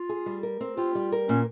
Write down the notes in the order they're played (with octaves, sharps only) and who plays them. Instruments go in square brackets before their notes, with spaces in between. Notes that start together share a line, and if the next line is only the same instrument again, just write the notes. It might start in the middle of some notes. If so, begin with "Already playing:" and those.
Already playing: [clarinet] F4
[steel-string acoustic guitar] G#4
G3
A#4
C4
[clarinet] F4 [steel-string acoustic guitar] G4
[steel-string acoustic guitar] G3
A#4
[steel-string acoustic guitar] A#2 [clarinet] C#4